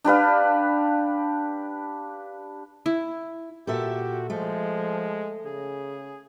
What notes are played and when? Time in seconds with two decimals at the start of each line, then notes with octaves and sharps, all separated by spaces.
0.04 D4 G4 B4 F5
2.86 E4
3.67 A#2 F#4 G4 A4 E5
4.30 F3 G#3 A3
5.45 C#3 G#4